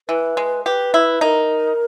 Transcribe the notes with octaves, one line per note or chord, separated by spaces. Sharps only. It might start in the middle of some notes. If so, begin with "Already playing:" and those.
E3 B4
G#3
G4 B4
E4
D#4 A#4